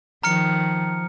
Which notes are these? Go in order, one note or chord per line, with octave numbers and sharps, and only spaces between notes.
D#3 F3 A#5 F6 C#7